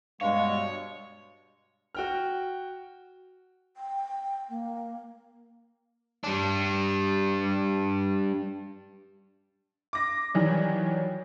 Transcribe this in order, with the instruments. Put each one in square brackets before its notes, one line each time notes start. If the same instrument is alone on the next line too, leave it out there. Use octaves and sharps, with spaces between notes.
[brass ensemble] G2 B2 [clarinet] G#3 [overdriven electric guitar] C#5 [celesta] F5
[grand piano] F#4 G5 F6
[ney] G5
A#3
[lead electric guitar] G3 D4
[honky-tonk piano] D6 A#6
[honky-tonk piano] D#3 E3 G3 [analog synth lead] F#3